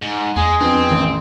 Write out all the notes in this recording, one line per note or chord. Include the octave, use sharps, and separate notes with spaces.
G#2
E2 G#3 G#4
F2 B3 C4 D4
A1 D#3